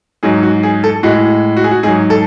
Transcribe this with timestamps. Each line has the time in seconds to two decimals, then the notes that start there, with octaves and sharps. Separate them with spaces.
0.23 G#2 F#3 G#4
0.43 F#4
0.63 G#4
0.84 A4
1.03 A2 G#3 F#4
1.57 F#4
1.64 G#4
1.71 F#4
1.83 G#2 G#4
1.87 F#3
2.10 A4